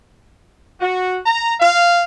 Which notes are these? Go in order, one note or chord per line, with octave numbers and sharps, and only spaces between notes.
F#4
A#5
F5